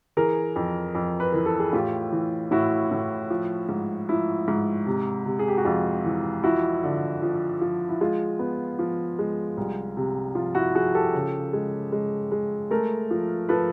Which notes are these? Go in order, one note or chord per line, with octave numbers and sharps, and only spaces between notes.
E3 G#4 A#4
F2
F2
B4
E3 A#4
A4
G#4
A2 F4 G4
E3
A2 E4 F#4
A2
F3
G#2
F3 E4
G#2
C3
C3
G#4
G4
F#4
F2 F4
E3
F3 E4 F#4
D3
F3
F3
E4
G#3 F4
B3
F3
G#3
C2
C3
F3 F4
E4 F#4
F3 F#4 G#4
G4 A4
C#3
G#3
G#3
G#3
A3 G#4 A#4
F3
F3 A4 B4